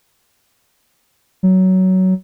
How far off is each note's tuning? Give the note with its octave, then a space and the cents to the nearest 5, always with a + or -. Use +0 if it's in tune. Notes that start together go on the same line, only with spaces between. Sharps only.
F#3 +15